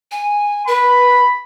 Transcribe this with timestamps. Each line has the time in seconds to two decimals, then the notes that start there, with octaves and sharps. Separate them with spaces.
0.11 G#5
0.67 B4 B5